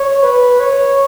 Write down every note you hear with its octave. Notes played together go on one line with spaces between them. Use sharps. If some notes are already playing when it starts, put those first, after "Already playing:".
Already playing: C#5
B4
C#5